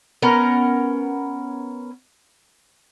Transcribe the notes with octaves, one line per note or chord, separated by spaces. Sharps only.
B3 C#4 A#4